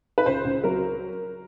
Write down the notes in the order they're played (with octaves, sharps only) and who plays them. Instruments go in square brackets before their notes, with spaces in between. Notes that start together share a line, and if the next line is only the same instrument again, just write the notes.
[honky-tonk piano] B4
C#2 C5
C#2
F#3 A#4